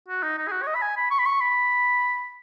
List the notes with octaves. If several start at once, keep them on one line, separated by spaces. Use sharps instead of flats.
F#4
D#4
D#4
G#4
F#4
C#5
D#5
B5
G#5
B5
C#6
B5
C#6
B5